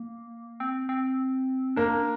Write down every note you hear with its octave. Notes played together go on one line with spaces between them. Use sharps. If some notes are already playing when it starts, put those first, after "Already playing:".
Already playing: A#3
C4
C4
A#3 D4